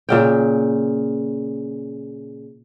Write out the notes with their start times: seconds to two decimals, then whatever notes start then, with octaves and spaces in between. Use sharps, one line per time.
0.09 A#2 C#3 G5